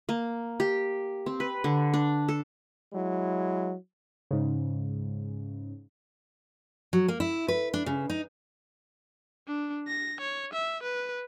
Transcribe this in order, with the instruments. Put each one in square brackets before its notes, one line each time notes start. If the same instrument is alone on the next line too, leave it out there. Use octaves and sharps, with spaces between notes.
[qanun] A#3
G4
C4
B4
D3
D4
A4
[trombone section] F#3 G#3 E4
[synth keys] G#2 C#3
[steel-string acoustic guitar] F#3
A#3
E4
B4
D4
C#3
D#4
[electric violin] D4
A#6
C#5
E5
B4